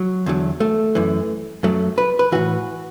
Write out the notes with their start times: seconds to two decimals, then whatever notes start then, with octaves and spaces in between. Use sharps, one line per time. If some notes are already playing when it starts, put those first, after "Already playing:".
Already playing: F#3
0.26 E2 D3 F#3
0.60 A3
0.95 F#2 E3
1.63 F#2 F#3 A3
1.98 B4
2.19 B4
2.32 A2 E3 F#4